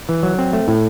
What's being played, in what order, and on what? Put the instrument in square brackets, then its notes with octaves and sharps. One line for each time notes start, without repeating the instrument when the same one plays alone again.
[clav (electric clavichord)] E3
F#3
C4
A3
A2